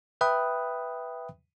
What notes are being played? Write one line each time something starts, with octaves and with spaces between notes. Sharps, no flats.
B4 E5 G5 B5 D#6 F#6